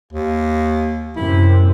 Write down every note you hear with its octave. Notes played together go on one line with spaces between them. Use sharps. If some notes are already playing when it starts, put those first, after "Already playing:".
D#2
F#2 C3 E4